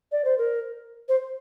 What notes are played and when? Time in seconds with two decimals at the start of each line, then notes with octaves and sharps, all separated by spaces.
0.12 D5
0.25 C5
0.38 A#4
1.09 C5